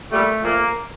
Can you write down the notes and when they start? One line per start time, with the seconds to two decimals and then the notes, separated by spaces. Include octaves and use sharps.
0.11 A#2 G3 A3
0.43 A#2 F3 A3 A#3